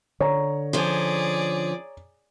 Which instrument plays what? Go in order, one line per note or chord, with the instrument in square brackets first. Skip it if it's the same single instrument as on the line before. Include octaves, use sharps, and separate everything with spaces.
[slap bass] D3 [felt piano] C#5 A#5
[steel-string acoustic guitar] F3 C#4 [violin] G#4 D5